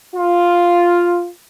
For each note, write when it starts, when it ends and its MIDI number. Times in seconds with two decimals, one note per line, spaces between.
0.16 1.28 65